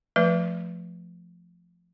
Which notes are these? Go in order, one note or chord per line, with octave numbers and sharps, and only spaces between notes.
F3 A3 B4